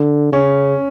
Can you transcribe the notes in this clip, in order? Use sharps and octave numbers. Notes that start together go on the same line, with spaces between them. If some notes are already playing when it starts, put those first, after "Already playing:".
Already playing: D3
C#3 C#4